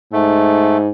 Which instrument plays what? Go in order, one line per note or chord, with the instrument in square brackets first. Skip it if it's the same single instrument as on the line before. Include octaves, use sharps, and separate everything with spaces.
[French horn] G#2 [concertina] A3